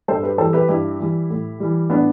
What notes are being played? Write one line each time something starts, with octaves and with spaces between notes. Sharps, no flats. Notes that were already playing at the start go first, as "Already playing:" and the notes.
G2 A4 C5
G4 B4
E3 G3 A4 C5
G4 B4
G2 E4 G4
E3 G3
A2
E3 G3
A2 B3 D4